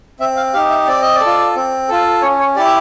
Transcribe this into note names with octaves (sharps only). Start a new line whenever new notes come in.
C4 E5
F5
D#4 G4 F5
E5
C4 D5
D#5
D5
A4
F4
C4
F4 A4
C#4 C#5
C#5
E4 G4 D5
E5